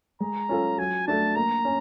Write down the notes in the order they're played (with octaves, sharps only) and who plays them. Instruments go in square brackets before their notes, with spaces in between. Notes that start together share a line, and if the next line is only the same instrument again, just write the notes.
[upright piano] G#3 [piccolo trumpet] A#5
[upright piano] C#4 F4 A4
[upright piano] F#3 [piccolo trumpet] G#5
[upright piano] A3 D4 [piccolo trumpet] A5
[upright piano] A#3 [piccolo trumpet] A#5
[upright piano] C#4